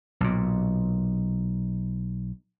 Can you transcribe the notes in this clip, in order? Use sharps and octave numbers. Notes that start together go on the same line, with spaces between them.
B1 A#2